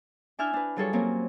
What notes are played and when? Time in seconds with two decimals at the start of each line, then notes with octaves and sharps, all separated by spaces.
0.39 D4 E4 E5 G#5 F6 G6
0.53 D4 B4
0.76 F#3 G3 F4 G#4 A4 C#5
0.93 F#3 A#3 C4 C#4